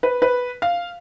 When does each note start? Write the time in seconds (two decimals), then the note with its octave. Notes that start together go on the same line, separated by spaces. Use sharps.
0.03 B4
0.22 B4
0.62 F5